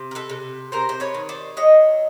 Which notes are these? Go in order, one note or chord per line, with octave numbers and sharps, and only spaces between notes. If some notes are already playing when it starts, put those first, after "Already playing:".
Already playing: C3
A#4
A4 B4
C3
C3 A#4 C5
C5
B4 C#5
D#3
C5 D5
F#3 C#5 D#5